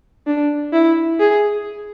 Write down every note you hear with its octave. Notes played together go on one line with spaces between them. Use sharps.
D4
E4
G#4